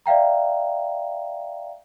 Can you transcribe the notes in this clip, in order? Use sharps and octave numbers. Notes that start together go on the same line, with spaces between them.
D5 E5 F5 G5 A#5